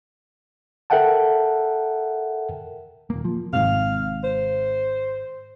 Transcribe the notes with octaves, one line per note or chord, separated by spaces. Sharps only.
A4 A#4 E5 F#5 G5 A5
D#1 A#3
F3
G#1 G#2 C3 F5
C5